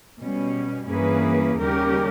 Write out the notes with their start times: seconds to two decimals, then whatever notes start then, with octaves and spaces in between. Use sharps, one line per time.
0.20 B2 G3 C#4
0.89 G2 E3 A#3 C#4 G#4 B4
1.58 D#2 C#3 G3 C#4 G4 A#4